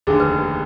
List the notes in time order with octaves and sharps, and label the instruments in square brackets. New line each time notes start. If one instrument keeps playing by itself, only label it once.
[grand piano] F1 D#2 D3 [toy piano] G#4
[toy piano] B4